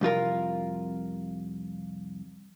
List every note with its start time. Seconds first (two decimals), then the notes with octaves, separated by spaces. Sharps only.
0.01 C2 F2 F4 A#4